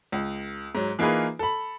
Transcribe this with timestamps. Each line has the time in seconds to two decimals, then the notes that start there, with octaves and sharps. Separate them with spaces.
0.12 C#2
0.75 G#2 F#3
0.99 E3 A#3 D#4 F4 G#4 B4
1.39 A4 B5